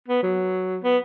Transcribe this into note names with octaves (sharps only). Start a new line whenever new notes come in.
B3
F#3
B3